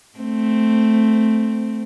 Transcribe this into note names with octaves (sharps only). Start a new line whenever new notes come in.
A3 C4